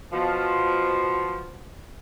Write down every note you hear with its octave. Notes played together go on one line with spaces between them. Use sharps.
B2 F3